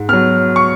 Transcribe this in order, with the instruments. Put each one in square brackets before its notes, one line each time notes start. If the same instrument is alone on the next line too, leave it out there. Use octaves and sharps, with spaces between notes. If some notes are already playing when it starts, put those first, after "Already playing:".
Already playing: [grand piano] G#2
F#3 B3 F6
C#6